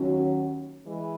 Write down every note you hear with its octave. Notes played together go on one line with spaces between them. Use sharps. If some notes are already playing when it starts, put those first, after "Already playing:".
Already playing: D#2 D#3 F#3 C#4 F#4
E3 G#3